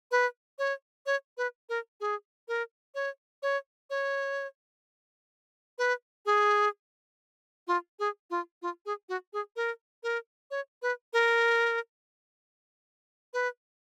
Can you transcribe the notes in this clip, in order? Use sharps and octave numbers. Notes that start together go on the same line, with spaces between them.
B4
C#5
C#5
B4
A#4
G#4
A#4
C#5
C#5
C#5
B4
G#4
F4
G#4
F4
F4
G#4
F#4
G#4
A#4
A#4
C#5
B4
A#4
B4